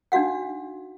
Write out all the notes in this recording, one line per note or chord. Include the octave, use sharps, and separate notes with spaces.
D4 D#4 F#4 F5 F#5